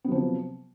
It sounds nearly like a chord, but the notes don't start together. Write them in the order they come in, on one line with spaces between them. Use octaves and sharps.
B3 F#3 F3 C3